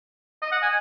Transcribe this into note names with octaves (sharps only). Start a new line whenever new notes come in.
D#5
F#5
G#5